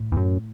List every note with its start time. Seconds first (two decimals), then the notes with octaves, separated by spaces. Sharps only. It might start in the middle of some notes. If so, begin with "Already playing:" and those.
Already playing: A2
0.12 E2
0.17 F#2